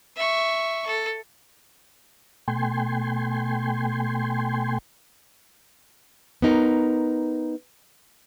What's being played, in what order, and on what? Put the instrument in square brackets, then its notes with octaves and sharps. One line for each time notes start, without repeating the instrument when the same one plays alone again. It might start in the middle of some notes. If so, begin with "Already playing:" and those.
[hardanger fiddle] E5 C#6
A4
[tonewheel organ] B2 A3 G5 G#5 C6
[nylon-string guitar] B3 D#4 A#4